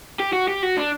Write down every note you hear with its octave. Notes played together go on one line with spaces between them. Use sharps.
G4
F#4
G4
F#4
D4